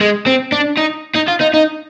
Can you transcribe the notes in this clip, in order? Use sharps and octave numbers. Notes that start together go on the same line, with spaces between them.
G#3
C4
D4
D#4
D#4
F4
D#4
D#4